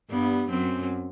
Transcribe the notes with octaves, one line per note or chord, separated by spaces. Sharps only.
G2 G3 B3
F#2 F#3 C4